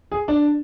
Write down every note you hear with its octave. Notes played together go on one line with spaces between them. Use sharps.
G#4
D4